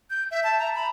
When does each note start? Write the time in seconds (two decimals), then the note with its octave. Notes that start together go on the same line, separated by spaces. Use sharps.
0.10 G6
0.31 E5
0.44 A5
0.59 A#5
0.75 B5